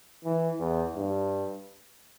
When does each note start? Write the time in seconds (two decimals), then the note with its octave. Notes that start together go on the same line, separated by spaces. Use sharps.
0.25 E3
0.60 E2
0.96 G2